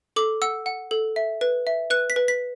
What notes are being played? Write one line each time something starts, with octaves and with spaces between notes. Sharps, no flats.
A4 D6
F#5 E6
F#5
A4
E5
B4
E5
B4 F#6
B6
B4
B6